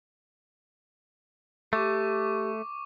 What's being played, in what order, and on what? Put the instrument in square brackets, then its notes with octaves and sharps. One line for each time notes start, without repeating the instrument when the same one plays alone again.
[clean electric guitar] A3 [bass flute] G4 [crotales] C#6 D6